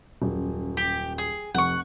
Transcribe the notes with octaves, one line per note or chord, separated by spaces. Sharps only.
D#1 F#2
G4
G#4
F1 F#5 C#6